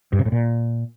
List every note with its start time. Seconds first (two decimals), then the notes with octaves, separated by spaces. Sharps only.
0.13 G2
0.19 C3
0.25 A2
0.32 A#2